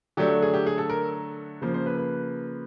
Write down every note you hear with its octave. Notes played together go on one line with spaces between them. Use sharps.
D3 F#3 A3 D4 G4
G#4
G4
G#4
A4
A#4
C#3 F3 A#3 C5
C5
B4
B4